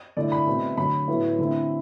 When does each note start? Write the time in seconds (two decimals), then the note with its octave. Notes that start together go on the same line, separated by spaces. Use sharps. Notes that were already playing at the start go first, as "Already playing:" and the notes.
0.17 D3 A3 E4 D5
0.32 B5
0.47 B2 A3 C4
0.77 D3 F#3 A3 B5
1.08 A2 F#3 B3 E4
1.39 D3 A3 C4 E4